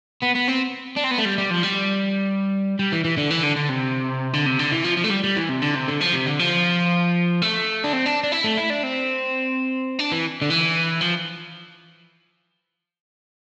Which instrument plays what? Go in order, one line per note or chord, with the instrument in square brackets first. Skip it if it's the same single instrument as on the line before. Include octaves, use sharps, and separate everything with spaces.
[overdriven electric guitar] B3
B3
C4
D4
C4
B3
A3
G3
G3
F3
G3
G3
E3
E3
D3
E3
D3
D3
C3
D3
C3
D3
E3
F3
F3
A3
G3
G3
E3
C3
D3
C3
D3
F3
C3
D3
F3
A3
D4
C4
D4
D4
E4
A3
E4
D4
C4
D4
E3
D3
E3
F3